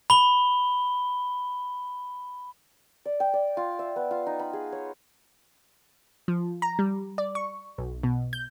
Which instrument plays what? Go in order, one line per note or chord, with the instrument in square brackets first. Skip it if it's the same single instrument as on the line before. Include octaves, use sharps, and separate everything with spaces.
[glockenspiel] B5 G7
[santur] D5
G5
D5
F4
E5
B3
F4
D#4
B5
G#4
C#5
[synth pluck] F3
A#5
G3
D5
C#6
B1
B2
G6